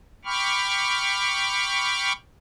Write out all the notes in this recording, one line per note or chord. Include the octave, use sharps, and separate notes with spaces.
G5 B5 C#6 D6 F6